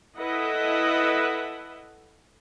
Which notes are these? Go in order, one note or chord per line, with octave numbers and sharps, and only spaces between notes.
E4 A4 B4 D#5 E5 F#5